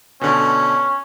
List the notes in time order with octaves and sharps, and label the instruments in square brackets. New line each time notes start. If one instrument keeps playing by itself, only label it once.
[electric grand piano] B2 D3 [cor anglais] C#4